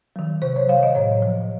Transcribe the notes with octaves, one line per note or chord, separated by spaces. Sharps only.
D#3 F#3
C3 C5
C#5
F#3 F5
D#5
A2 C#5
F3